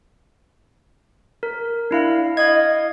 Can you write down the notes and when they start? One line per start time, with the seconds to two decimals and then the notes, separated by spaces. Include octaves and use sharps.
1.43 A#4
1.91 D4 E4 F5
2.37 D#5 F5 G#6